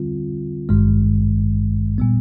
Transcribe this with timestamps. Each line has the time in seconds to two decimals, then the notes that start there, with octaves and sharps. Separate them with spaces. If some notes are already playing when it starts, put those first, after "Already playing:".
Already playing: D3 G3 C4 F4
0.69 G#1 G2 D#3 G#3
1.98 A#2 G3 B3